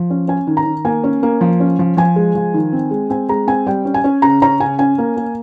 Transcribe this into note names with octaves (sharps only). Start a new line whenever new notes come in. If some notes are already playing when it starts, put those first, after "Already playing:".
Already playing: F3
C#4
C#4 G#5
D#3
A#5
D#3
A#3 G#5
C#4
A#3
F3
C#4
F3
F3 G#5
G#3
F3
D#3
C4
G#3
C4 G#5
G#3 A#5
C4 G#5
G3 G5
C#4
G#5
C#4
C#3 A#5
C#4 A#5
C#3 G#5
C#4 G#5
A#3
A#3